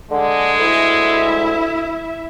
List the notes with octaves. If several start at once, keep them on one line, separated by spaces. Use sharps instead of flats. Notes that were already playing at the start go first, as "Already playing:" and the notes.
D3 G#3
D2 E4 E5